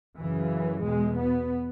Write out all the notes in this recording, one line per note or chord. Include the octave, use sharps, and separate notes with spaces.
F#2 C#3 E3
E2 B2 G#3
B3